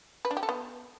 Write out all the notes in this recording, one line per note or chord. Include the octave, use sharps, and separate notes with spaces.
B4
D4
G4
A4
B3